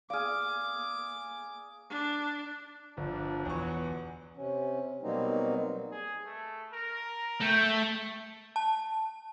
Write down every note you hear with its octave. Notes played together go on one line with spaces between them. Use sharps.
G#4 D5 F5 D6 F6
D4
G1 F3 D4
E2 B2 F#3 C#6
C3 C#4
B2 F#3 G3 A#3 C4 D#4
G#4
A3
A#4
A3 G5
A5